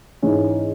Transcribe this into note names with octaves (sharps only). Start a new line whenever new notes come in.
G#2 E3 C#4